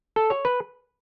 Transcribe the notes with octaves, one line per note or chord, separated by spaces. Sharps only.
A4
C#5
B4